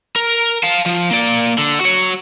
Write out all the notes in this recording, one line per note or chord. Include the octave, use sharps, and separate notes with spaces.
A#4
F5 A5
F3
A#3 D5
D3
F#4 C#5